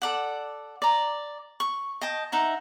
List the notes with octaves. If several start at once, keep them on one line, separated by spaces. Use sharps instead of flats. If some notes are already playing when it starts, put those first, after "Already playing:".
A4 D5 F#5
D5 A#5
C#6
D#5 G5 A5
D#4 E5 F#5